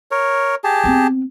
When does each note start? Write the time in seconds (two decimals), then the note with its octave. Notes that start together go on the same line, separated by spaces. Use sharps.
0.11 A#4 C#5
0.64 G4 G#4 A5
0.84 B3 C4